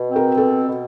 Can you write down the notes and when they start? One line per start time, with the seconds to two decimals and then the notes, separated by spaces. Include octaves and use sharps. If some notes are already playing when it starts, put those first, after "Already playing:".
Already playing: B2
0.09 C4
0.16 A#4
0.37 B2 A4
0.67 B2